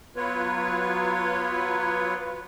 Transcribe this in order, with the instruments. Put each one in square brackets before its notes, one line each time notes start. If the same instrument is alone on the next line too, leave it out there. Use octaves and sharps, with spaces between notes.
[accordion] F#3 B3 F4 B4 C#5